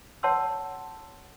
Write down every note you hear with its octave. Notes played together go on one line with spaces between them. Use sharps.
C#5 F#5 A5 C6 E6